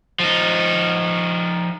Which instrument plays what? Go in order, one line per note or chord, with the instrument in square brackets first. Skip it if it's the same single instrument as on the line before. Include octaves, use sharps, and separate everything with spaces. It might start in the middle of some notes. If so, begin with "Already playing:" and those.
[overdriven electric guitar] F3 D#4